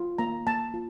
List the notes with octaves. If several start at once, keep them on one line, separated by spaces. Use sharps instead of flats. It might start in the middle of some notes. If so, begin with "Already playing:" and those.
Already playing: F4
A#3 A#5
A#3 A5
F4